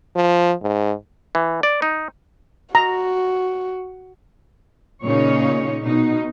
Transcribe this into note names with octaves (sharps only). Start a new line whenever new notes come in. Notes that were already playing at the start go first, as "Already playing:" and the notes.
F3
G#2
E3
D5
D#4
F#4 A#5
A#2 C#3 C#4 D#4 C#5
B2 D#4